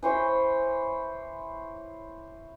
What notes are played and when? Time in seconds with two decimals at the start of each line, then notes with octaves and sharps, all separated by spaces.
0.03 E3 C5 C#5